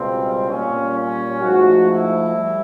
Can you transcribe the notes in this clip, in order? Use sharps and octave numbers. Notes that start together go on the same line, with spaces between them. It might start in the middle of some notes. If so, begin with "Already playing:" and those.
Already playing: C#2 B2 G3 C4
A#2 G3 C#4
C#4
G#2 F3 A3 F#4
E4
G3